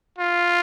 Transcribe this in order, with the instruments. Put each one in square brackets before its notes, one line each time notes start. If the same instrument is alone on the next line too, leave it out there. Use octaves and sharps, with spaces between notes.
[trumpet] F4